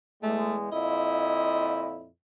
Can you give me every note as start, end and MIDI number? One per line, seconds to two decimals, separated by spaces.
0.23 0.68 40
0.23 0.68 56
0.23 0.56 57
0.72 2.08 41
0.72 2.08 46
0.72 2.08 64
0.72 2.05 75